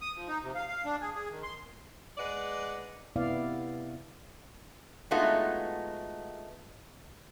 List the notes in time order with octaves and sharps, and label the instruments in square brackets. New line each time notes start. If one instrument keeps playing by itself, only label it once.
[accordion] D#6
F3
D#4
C3
F5
F5
D4
G#4
G#4
D#3
C6
[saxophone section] G#3 B4 D5 D#5 F#5
[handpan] C3 B3 E4 D5 F5
[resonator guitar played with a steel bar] G#3 A3 B3 D#4 F4 F#4